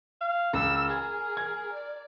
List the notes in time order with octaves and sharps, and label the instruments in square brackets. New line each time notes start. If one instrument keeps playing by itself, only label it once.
[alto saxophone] F5
[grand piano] C#2 [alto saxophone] A#4 [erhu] E6
[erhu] G#4 [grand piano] G#6
[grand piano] G#6
[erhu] D5